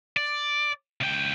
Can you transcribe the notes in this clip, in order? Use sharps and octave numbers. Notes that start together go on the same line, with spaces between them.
D5
C#2 G5